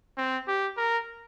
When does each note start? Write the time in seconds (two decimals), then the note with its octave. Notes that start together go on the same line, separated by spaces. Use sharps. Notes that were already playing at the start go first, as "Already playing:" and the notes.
0.17 C4
0.47 G4
0.77 A#4